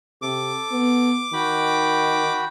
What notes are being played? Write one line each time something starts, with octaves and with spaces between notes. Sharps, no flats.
C3 A4 D6
B3
D#3 F#4 G5 B5